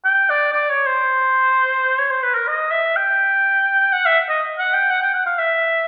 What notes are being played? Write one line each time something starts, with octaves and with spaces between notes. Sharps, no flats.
G5
D5
D5
C#5
C5
C#5
C5
B4
A#4
D#5
E5
G5
F#5
E5
D#5
F#5
G5
F#5
G5
F#5
F5
E5